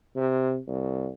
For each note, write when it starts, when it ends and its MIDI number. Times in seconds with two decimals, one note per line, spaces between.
0.16 0.58 48
0.67 1.09 36